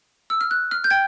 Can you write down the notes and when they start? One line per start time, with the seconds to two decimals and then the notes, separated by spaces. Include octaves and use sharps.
0.30 E6
0.41 F6
0.51 F#6
0.71 F6
0.84 G6
0.90 G5 G#6